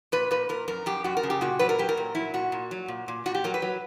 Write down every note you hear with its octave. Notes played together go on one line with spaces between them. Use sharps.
A#2 B4
A#2 B4
A#2 A#4
F#2 A#4
F#2 G4
F#2 F#4
A#4
C#3
G4
A#2 F#4
F#3 B4
A#4
F#3 G4
A#4
A#2
F#3 E4
A#2 F#4
A#2
F#3
A#2
A#2
A#2 F#4
G4
F#3 A#4
B4
F#3